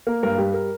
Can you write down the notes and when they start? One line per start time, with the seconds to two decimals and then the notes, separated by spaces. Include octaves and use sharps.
0.07 A#3 A#4
0.23 G2 A#4
0.38 G3 G4
0.54 A#4